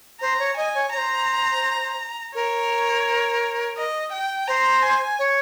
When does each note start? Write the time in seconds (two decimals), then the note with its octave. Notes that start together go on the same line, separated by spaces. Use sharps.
0.21 C5 A#5
0.39 C#5
0.56 D#5 G#5
0.74 C#5
0.92 C#5 A#5
0.97 C5
2.35 A#4 C#5
3.77 D#5
4.12 G5
4.48 C5 A#5
4.83 G#5
5.19 C#5